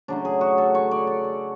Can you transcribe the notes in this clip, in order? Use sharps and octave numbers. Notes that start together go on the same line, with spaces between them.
C#3 F#3 A3 D4
G#4
F#4
A4
C#5
D5
D5
D5